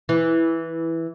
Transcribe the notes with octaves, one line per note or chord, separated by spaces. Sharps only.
E3